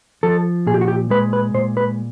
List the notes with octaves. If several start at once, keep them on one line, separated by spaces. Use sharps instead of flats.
F3 A4
A#2 G#4
G4
F#4
G4
G#3 B4
B4
A#2 C5
B4